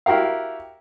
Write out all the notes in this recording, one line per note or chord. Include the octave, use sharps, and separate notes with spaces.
E4 F#4 G4 A#4 F5